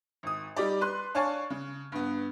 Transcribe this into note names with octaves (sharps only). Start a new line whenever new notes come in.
G#1 D#6
G3 D#4 G4 D5
B4 C6 F#6
D4 C#5 F5 G#5 A5 C#6
C#3
G2 B3